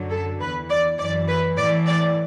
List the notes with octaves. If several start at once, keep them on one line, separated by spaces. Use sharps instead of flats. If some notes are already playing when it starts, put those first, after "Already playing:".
Already playing: F#2 D3 F#3
A4
E2 E3 B4
D5
F#2 E3 D5
B4
A2 E3 D5
D5